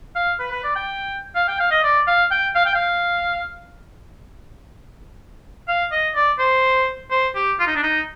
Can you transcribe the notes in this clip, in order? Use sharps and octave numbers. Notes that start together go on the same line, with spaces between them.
F5
B4
B4
D5
G5
F5
G5
F5
D#5
D5
F5
G5
F5
G5
F5
F5
D#5
D5
C5
C5
G4
F4
D#4
D4
D#4